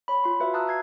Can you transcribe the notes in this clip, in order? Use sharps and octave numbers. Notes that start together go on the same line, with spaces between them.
C#5 B5
F4 C6
F#4 B4 E5 F5
F5 A5 A#5 D#6 E6 F#6
F#6 G#6 C7